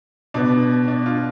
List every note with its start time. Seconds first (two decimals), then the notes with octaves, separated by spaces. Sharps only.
0.34 B2 B3 D4
0.88 D4
1.06 F4